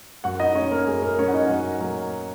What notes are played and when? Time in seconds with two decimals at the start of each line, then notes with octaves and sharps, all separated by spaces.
0.24 F#2 F#4 F#5
0.40 D#4 D#5
0.55 F#3 C#4 C#5
0.60 A#3
0.71 A#3 A#4
0.87 F#2 G#4
1.02 A#3 A#4
1.18 F#3 A#3 C#4 C#5
1.28 F#5
1.33 D#4 D#5
1.49 F#2 F#4 F#5
1.81 F#3 A#3